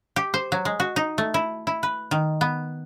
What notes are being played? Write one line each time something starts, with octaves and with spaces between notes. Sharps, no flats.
G4
C5
F#3
G#3
F#4
D#4
A3
E4
E4
B4
D#3
B3